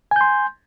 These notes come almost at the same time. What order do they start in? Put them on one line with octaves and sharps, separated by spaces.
G#5 G6 C6